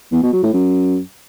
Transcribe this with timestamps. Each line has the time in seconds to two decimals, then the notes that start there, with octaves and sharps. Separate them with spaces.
0.12 E2
0.23 B2
0.33 F#3
0.43 A2
0.53 F#2